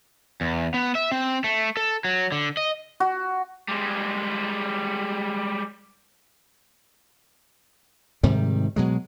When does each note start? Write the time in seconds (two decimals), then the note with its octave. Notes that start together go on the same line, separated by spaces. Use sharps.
0.41 E2
0.74 B3
0.95 E5
1.12 C4
1.44 A3
1.77 A4
2.05 F#3
2.32 D3
2.57 D#5
3.00 F#4
3.69 G3 G#3
8.23 G#2 C3 D#3 G3
8.76 B2 F#3 G#3